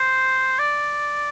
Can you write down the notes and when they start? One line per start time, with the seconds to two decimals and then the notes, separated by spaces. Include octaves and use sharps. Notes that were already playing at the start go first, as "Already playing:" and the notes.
Already playing: C5
0.59 D5